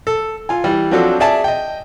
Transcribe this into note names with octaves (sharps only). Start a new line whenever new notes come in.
A4
F4 G#5
E3 G3
F3 F#3 C4 D4 F#4 A4
G#4 D5 E5 G#5 A5
D#5 G5